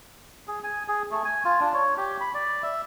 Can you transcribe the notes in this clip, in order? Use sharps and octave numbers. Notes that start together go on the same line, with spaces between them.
G#4
G#5
G#4
A3
G#5
F4
D4
C#5
G4
B5
D5
E5